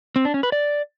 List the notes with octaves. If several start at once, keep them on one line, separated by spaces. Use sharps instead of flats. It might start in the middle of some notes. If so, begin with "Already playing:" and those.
C4
D4
C#4
B4
D5